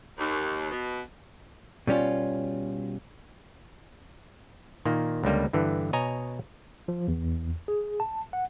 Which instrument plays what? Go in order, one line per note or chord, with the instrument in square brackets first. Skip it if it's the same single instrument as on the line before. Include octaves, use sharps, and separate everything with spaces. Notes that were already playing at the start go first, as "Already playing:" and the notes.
[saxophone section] D#2
B2
[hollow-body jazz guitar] B2 G3 C#4 F4
[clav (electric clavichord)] A#2 D#3 A#3
C#2 D3 G3 A#3
G2 D3 E3
B2 C#5 D#5 G#5 A#5
[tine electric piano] F3
E2
G#4
A5
F#5